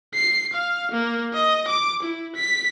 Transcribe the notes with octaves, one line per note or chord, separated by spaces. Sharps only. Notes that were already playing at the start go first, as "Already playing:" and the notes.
C7
F5
A#3
D#5
D6
E4
B6